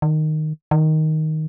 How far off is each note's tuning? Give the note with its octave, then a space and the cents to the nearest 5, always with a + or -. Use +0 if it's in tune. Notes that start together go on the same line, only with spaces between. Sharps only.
D#3 -10
D#3 +5